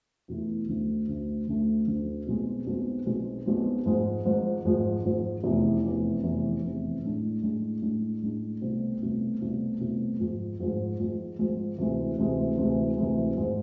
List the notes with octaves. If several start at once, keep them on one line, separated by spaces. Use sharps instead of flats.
E2 B2 A3 E4
D2 D3 A3
D2 D3 A3
D2 D3 A3
D2 D3 A3
B1 B2 G#3 C4
B1 B2 G#3 C4
B1 B2 G#3 C4
B1 B2 G#3 C4
G#1 G#2 F3 G#3
G#1 G#2 F3 G#3
G#1 G#2 F3 G#3
G#1 G#2 F3 G#3
F1 E2 C3 E3
F1 E2 C3 E3
F1 E2 C3 E3
F1 E2 C3 E3
A2 G#3 D4
A2 G#3 D4
A2 G#3 D4
A2 G#3 D4
C2 B2 A3 C4
C2 B2 A3 C4
C2 B2 A3 C4
C2 B2 A3 C4
G#1 G#2 F3 G#3
G#1 G#2 F3 G#3
G#1 G#2 F3 G#3
G#1 G#2 F3 G#3
D2 C3 E3 G#3
D2 C3 E3 G#3
D2 C3 E3 G#3
D2 C3 E3 G#3
G#1 G#2 G#3